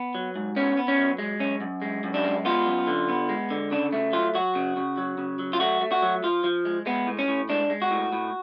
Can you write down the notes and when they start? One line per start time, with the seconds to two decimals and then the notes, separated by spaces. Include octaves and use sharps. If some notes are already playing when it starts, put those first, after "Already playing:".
Already playing: B3
0.15 F#3
0.36 G#2
0.56 B3 C#4
0.77 B3
0.88 C#4
0.98 F#3
1.18 G#3
1.39 F#2 C#4
1.61 F#2
1.82 G#3
2.04 F#2
2.14 D4
2.24 G#3
2.45 B3 F4
2.66 F#2
2.87 D3
3.09 B3
3.29 G#3
3.50 D3
3.71 C#3 D4
3.93 A3
4.13 F#3 F4
4.35 F#3 F#4
4.55 C#3
4.77 C#3
4.98 F#3
5.18 C#3
5.39 F#3
5.53 F4
5.60 A3 F#4
5.81 A3
5.92 F#4
6.02 F#3
6.24 F3 F4
6.44 F3
6.65 G#3
6.86 G#3 B3
7.07 A2
7.19 C#4
7.28 A2
7.49 G#3 D4
7.70 G#3
7.82 F#4
7.91 A2
8.13 A2